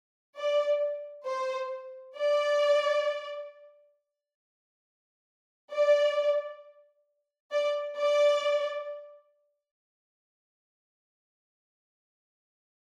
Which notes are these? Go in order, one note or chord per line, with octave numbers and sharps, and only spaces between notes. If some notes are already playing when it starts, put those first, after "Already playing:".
D5
C5
D5
D5
D5
D5